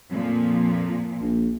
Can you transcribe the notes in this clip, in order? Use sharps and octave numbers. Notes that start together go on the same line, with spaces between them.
F2 A#2 F3
A#1